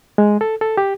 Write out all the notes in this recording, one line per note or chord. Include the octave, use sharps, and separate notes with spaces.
G#3
A4
A4
G4